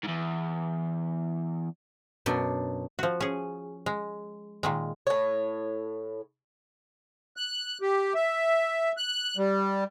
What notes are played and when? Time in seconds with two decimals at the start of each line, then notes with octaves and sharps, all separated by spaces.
0.04 E2 G#2
2.26 F#2 B2 D4
2.99 F3 F#4
3.20 C#4 G#4
3.86 G#3
4.63 A#2 D#3 G#3
5.07 A2 C#5
7.37 F#6
7.81 G4
8.15 E5
8.97 F#6
9.37 G3